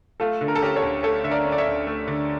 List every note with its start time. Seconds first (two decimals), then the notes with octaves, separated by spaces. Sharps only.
0.20 A3 F4 A4
0.41 D3
0.48 A#4
0.55 A4
0.62 C#4 G4 A#4
0.76 A4 C#5
0.82 D2
1.03 A3 A4 C#5
1.24 D3 E5
1.31 A#4 D5
1.45 C#4
1.52 D5
1.58 C#5 E5
1.65 D2
1.87 A3
2.08 D3